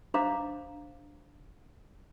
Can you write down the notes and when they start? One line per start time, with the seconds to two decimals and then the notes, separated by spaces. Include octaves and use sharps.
0.14 D4 C5 F5 A#5 D6